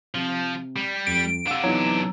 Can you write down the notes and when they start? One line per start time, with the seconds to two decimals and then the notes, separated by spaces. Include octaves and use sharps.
0.15 C3 F3
0.77 G3
1.07 F2 D7
1.47 C3 D4 F5 F#5 E6
1.64 E3 F#3 B3 D#4